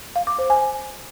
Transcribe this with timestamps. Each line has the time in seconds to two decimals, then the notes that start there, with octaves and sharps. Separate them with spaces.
0.16 F5
0.27 D6
0.38 C5
0.50 G#5